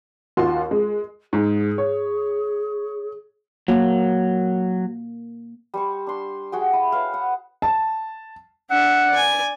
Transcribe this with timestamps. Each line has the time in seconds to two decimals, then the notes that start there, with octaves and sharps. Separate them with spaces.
0.37 D#2 F4 F#4 C6
0.71 G#3
1.33 G#2 G#4
1.78 C#5
3.68 F#3 A#3
5.74 G3 C5 C#6
6.07 D4 C6
6.52 F#4 G#4 G5
6.73 E4
6.92 B4 C#5 E5 F5
7.14 F#5
7.62 A5
8.71 D4 E5 F#5
9.10 D5 G#5